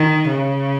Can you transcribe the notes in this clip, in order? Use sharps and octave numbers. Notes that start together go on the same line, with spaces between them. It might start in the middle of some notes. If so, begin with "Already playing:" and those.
Already playing: D#3
C#3